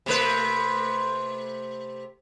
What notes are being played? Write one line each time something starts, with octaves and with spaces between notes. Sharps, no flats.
C3 A3 B4